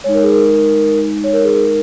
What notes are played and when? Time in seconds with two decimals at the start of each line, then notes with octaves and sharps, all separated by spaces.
0.04 G#3 D#4 C#5
0.14 A#4
0.23 G#4
0.33 A#4
1.24 C#5
1.33 A#4
1.44 G#4
1.53 A#4